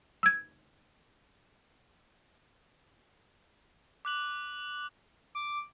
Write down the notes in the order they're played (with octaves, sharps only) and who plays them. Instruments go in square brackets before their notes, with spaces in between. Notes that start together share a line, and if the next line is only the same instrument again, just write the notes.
[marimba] E6 G#6
[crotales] D6 F#6 F#7
[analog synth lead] D6